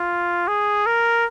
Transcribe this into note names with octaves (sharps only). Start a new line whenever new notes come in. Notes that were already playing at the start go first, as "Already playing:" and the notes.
Already playing: F4
G#4
A#4